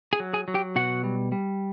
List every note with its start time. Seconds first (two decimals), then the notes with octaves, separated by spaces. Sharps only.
0.13 G#4 G#5
0.20 F#3
0.33 G#4 G#5
0.48 F#3
0.54 G4 G5
0.75 B2 F#4 F#5
1.04 G3
1.32 G3